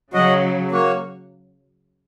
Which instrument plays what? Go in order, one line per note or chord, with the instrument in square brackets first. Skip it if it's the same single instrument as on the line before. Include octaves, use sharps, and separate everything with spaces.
[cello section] C#3 F#3 [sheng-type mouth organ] F#4 D#5 F#5
[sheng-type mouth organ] A#3 F#4 C#5